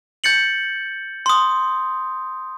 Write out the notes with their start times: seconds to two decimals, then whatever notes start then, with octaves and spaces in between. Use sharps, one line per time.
0.24 G6 A6 C#7 F#7
1.26 C6 D#6